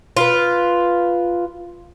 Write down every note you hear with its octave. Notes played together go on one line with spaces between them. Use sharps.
F4 B4